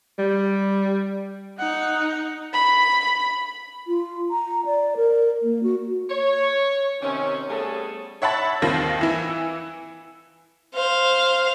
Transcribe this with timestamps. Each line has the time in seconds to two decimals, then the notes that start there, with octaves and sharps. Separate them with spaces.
0.19 G3
1.59 D#4 F#5
2.53 B5
3.87 F4
4.31 A#5
4.66 D5
4.97 A#4
5.42 A#3
5.63 F#4
6.10 C#5
7.02 C3 D#3 C4 C#4
7.49 G3 A3 B3 C#4 G#4 A4
8.22 C#5 E5 F#5 A5 B5 A6
8.62 D#2 D#3 C4 F4 A#6
9.01 E3 E4
10.75 C5 F5